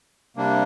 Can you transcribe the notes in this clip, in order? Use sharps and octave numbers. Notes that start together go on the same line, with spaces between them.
C3 G3 A#3 D4